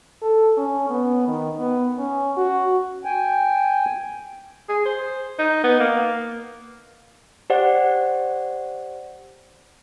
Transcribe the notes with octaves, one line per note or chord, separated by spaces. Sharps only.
A4
C#4
B3
D#3
B3
C#4
F#4
G5 G#5
G#4
C5
D#4
B3
A#3
G4 C5 D5 F#5